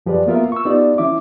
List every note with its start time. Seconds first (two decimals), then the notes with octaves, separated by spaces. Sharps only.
0.06 F#2 F3 G4 G#4 B4 D5
0.27 A#3 B3 F4 A#4 E5
0.52 C#6 E6
0.65 B3 D#4 F4 G4 D5
0.98 E3 C#4 E4 E5 D6